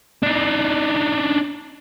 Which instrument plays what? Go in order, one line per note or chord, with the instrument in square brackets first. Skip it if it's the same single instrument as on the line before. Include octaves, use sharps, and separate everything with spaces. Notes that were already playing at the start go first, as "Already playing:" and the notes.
[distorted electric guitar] D4 D#4